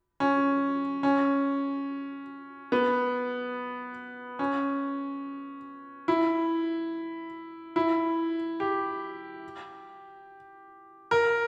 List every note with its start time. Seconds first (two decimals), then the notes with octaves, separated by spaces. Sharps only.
0.20 C#4
1.03 C#4
2.72 B3
4.39 C#4
6.08 E4
7.76 E4
8.60 G4
11.11 A#4